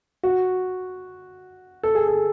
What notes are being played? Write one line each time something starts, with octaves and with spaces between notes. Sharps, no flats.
F#4
A4
G#4
A4